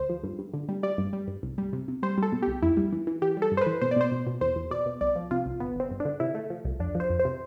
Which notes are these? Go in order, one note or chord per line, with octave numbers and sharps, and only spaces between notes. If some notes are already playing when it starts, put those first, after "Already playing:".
Already playing: D2 C5
F3
G2
G2
D3
G3
G3 D5
G2
G3
G2
C2
G3
C3
C3
G3 C5
G3 A4
B2
G4
C2
F2 E4
G3
E3
E3
E3 G4
G3
A4
G2
C5
B4
E3
B2 C5
D5
B2 C5
B2
B2
E2 C5
E2
B2 D5
B2
C2 D5
F3
C3 F4
C2
G1 B3
G1 C4
G2
D4
D3
C3 E4
A3
F3
C2
F2 D4
F3
C5
F2
C5
C3